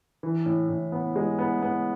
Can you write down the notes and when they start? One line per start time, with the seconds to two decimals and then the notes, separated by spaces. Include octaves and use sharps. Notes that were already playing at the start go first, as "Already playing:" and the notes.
0.23 E3
0.46 A2
0.69 A2
0.92 B3
1.16 G#3
1.39 B3
1.62 B3